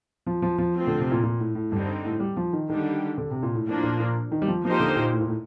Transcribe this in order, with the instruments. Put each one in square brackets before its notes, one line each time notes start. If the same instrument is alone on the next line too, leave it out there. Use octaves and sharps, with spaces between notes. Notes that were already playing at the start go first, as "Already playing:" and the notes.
[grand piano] F3
F3
F3
[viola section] F3 A3 C4 F4
[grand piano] D3
C3
A#2
A#2
A2
A2
[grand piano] G2 [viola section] D3 G3 C4 D#4
[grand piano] A2
G3
F3
D#3
[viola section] D3 G3 D4 G4 [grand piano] D#3
[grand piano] D3
C3
A#2
A2
[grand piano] A2 [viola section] F3 A#3 D4
[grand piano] A#2
A#2
D#3
G3
F3
[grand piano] F3 [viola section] A#3 D#4 G4 C5
[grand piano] D3
A#2
A2
A#2
A2